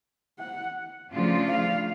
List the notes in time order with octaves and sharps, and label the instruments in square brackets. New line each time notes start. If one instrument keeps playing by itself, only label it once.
[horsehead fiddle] F#5
[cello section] C#3 F3 A3 D4 F4
[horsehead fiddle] F5